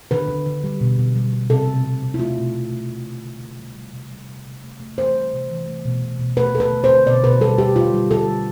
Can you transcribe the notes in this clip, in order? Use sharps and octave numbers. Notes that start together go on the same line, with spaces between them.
D3 B4
D3
D3
G3
B2
B2
G3
G3
C3 A4
C3
C3
C3
E4
A3 F4
B2
A3
A3
A3
D3
D3
A3
G3
G3
C3
G3
C3
C3
A3
A3
E3 C5
G3
C3
E3
A3
B2
B2
B2
A3 B4
A3 A4
B4
D3
D3 C5
B2 D5
B2 B4
G3 A4
G3 G4
D3 F4
G3
D3 A4
G3